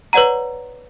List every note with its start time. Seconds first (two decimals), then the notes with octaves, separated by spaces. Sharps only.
0.13 B4 C#5 D5 F#5 A#5